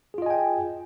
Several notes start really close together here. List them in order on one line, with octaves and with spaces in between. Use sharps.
G#4 F4 D#5 G#5 G5